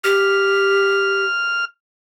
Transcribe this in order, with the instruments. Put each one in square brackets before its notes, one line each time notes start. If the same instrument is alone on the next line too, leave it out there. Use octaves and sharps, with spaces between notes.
[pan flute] G4 [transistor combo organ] F6